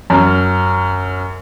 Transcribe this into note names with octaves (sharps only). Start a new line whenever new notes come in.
F#2